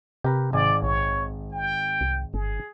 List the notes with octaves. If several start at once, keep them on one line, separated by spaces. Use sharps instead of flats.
C3 G4 A#4 B4
G#1 G#2 D5 G#5
A#1 C#5
G5
C2
G1 G#4